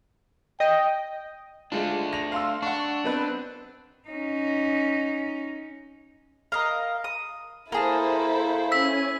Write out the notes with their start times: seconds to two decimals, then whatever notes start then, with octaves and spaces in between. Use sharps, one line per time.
0.60 D#5 G5
1.72 G#3 A3 D4 F4
2.13 A#6 F7
2.32 F5 C6 E6
2.63 D4 F#5 C#6
3.04 B3 C4 B4
4.08 C#4 D#4
6.52 A#4 D#5 F5
7.04 D#6
7.72 A#3 E4 G#4 A4 C5 A5
8.72 C#4 G#5 E6 B6